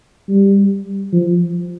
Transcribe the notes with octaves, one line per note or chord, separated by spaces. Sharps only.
G3
F3